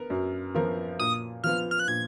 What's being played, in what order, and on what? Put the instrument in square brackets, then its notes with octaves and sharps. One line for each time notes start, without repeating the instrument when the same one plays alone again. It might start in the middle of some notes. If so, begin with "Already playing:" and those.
Already playing: [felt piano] B3 A#4
F#2
F3 B3 F4 A#4
[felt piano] A#2 [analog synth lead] D#6
[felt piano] F3 B3 F4 [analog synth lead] F6
[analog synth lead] F6
F#6
[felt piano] A#2 [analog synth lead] G#6